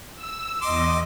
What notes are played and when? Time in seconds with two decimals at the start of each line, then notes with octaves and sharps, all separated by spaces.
0.15 E6
0.62 E2 D#5 C6 D6